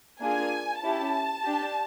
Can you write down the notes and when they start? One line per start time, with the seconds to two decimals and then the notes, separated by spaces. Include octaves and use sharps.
0.20 A#3 D4 F4 G#4 G#5
0.82 C#4 E4 G4 A5
1.44 D4 G4